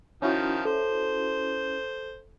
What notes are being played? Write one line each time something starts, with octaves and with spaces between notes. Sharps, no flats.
D#3 F3 C#4 E4 F#4
A4 C5